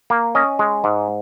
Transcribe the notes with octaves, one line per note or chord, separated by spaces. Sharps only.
A#3
C#4 D#5
G#3
G#2